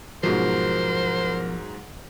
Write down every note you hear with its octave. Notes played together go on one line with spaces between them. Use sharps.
G#2 B2 F3 F#3 A#4 C5